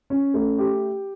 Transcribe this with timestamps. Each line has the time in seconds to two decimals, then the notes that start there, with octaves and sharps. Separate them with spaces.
0.10 C#4
0.34 A3
0.58 G4